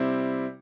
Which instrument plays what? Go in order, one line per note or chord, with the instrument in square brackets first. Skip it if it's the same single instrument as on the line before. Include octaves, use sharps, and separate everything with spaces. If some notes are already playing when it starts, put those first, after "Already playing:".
Already playing: [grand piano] C3 G3 C4 E4